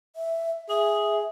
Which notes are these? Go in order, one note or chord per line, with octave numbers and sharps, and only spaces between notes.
E5
G#4 E5